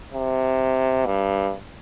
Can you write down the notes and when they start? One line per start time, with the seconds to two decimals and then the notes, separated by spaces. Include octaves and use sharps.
0.14 C3
1.06 G2